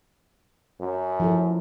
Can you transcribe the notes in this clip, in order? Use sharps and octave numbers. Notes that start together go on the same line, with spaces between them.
F#2
F3 E4 A4